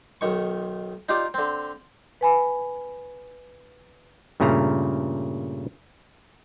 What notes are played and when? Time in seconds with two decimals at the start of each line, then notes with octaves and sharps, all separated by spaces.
0.21 B1 D#3 C#6
1.09 D#4 F4 G4 D5
1.34 D3 C4
2.21 B4 G#5 B5
4.40 G2 A#2 C#3 A3 A#5